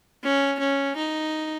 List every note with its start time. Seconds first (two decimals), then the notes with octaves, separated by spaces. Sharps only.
0.23 C#4
0.60 C#4
0.96 D#4